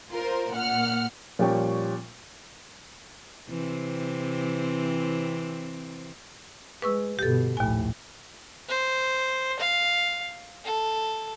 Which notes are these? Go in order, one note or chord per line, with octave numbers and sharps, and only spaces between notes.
F4 A#4 C5
A#2 F#5 F6
A#2 F3 G3 C#4 G5 C#6
C3 E3 C4
G#3 B4 C#6 E6
G1 B2 G4 A4
A#1 D#2 A2 G#5
C5
F5
A4